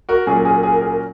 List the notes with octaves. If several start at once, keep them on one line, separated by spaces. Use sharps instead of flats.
F#4 A#4
A#2 F#3 C#4 G#4
A#4
G#4
A#4
G#4
A#4
G#4
A#4